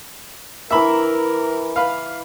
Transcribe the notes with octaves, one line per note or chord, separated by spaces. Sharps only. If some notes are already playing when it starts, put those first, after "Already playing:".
E3 A#4 E5 A#5 B5 D6
B4 F5